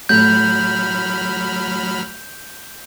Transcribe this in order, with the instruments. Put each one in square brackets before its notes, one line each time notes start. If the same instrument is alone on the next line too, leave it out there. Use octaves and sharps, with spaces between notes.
[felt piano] A2 A3 [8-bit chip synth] F#3 B5 F6 [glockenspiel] G6